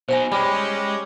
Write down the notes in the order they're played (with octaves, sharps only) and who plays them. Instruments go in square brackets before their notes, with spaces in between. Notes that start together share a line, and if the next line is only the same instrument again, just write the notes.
[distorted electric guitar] B2 D#4 [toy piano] C5 G5 G#5
[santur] G3 [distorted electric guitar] G#3 [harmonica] C#4 G4